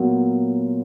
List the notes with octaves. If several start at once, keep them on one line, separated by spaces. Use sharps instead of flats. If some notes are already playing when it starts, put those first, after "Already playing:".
Already playing: A#2 F#3 B3